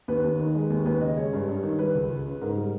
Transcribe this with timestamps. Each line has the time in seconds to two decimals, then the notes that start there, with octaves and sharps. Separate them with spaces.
0.08 D#2 B4
0.24 D#2
0.39 D#3
0.55 G#3
0.70 D#2
0.86 D#2 B4
1.01 C#3 D#5
1.17 G#3 C#5
1.33 G2
1.48 G2
1.63 D#3
1.79 G3 B4
1.95 C#2
2.10 C#2
2.26 C#3
2.41 G#2 A#4
2.57 G3